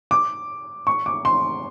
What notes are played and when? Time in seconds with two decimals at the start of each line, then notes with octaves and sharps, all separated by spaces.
0.11 D6
0.87 C#6
1.06 D6
1.25 C6